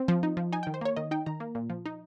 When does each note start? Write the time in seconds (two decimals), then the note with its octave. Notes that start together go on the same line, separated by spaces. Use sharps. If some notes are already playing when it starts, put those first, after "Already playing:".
Already playing: C4
0.08 F3
0.23 D#4
0.37 F3
0.52 D#4 G#5
0.63 G5
0.67 D#3
0.74 C5
0.81 A#3 C#5
0.97 D#3 D#5
1.11 D#4 G5
1.26 D#3 A#5
1.40 A#3
1.55 A#2
1.70 F3
1.86 D#4